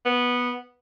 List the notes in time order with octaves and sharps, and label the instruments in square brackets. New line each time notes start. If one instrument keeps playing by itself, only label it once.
[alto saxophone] B3